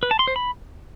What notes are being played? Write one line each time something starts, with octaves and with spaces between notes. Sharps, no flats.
B4
A5
C6
C5
B5